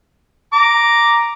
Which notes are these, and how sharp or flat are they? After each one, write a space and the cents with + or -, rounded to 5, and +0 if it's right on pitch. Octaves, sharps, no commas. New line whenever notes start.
A#5 +0 D6 +0